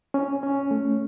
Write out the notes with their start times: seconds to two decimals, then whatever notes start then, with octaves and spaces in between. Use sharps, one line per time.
0.14 C#4
0.43 C#4
0.71 A3